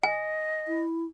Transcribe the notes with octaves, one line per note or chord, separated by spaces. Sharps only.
D#5 G#5
E4